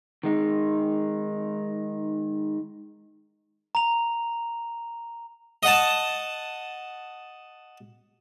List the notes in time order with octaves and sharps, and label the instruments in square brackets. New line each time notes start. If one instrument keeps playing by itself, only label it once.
[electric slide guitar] D#3 G#3 D#4
[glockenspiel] A#5 F7
[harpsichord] D#5 F#5 A5